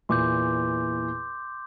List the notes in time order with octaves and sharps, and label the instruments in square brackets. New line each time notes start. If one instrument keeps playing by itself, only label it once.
[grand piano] E2 A#2 E3 [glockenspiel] C6 D6 G6